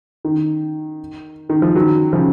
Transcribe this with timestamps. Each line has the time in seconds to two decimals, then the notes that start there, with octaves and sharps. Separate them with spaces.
0.25 D#3
1.49 D#3
1.62 F3
1.75 D#3 F#3
2.13 C#3 F3